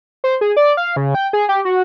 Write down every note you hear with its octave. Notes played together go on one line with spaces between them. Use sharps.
C5
G#4
D5
F5
C#3
G5
G#4
G4
F#4